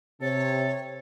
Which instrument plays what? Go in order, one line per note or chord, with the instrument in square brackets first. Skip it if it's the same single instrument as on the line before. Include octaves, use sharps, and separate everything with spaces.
[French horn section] C3 [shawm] A4 [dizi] C#5